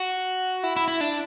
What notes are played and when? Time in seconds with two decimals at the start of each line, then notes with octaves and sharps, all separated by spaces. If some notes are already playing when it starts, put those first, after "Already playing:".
Already playing: F#4
0.63 E4
0.76 E4
0.88 E4
1.01 D4